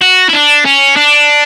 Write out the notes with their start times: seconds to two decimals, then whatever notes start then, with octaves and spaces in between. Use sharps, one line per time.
0.01 F#4
0.29 E4
0.33 D4
0.65 C#4
0.97 D4